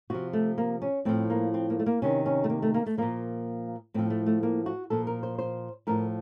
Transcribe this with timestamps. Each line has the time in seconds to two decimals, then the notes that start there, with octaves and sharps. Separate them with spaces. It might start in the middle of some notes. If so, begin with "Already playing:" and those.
0.10 C3 F3 F#4
0.33 A3
0.58 A#3
0.82 C#4
1.05 A2 F3 C4
1.30 A#3
1.54 C4
1.70 A#3
1.79 A3
1.86 A#3
2.02 C3 D#3 C#4
2.26 C#4
2.44 A3
2.50 A#3
2.62 A3
2.74 A#3
2.86 A3
2.98 A#2 F3 A#3
3.94 A2 F3 C4
4.10 A3
4.26 A3
4.43 A#3
4.66 F#4
4.90 A#2 F3 A4
5.07 A#4
5.23 C5
5.39 C5
5.87 A2 F3 A#4